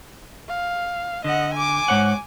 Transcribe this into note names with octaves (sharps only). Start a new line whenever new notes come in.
F5
D3 D#5 F#5
G#5 D6
G#2 C#5 F#5